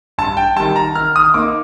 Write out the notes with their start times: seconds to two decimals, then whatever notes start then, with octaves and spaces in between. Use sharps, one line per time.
0.18 G2 A5
0.37 G5
0.56 D#3 G3 A5
0.76 A#5
0.95 D#3 F6
1.16 D#6
1.34 A#3 D#4 D6